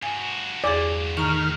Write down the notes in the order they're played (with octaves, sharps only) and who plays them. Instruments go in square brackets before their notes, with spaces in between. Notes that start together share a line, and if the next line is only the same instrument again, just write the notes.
[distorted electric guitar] G2 F#4 [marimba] G#5
[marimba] E2 G#4 [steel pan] D5
[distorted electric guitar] A2 [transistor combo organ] D#3 F6 [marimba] A#5 C#6